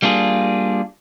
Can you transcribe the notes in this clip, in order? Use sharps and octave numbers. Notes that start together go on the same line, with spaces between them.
G3 A#3 D4 F4 G#4